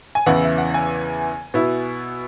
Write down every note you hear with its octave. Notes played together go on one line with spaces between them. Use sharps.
G#5
E2 C#3 E3 B3 E4 F#5
E5
F#5
G#5
B2 B3 E4